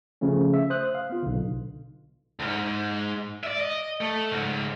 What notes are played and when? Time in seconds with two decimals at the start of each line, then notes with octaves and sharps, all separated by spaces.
0.21 C#3 F3 A3 C#4
0.54 E5
0.70 C5 D#6 F#6
0.95 F5
1.10 B3 F4
1.23 B1 D3
2.40 D2 G#2
3.44 D5 E5
3.60 D#5
4.01 A3
4.31 C#2 G#2